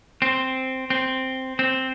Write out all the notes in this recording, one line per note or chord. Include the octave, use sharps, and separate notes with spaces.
C4
C4
C4